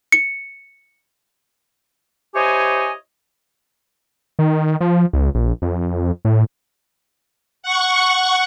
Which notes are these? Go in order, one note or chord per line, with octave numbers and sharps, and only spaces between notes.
C#7
E4 G4 C5 C#5 D#5 G#5
D#3
F3
C#2
A#1
F2
A2
F#5 C#6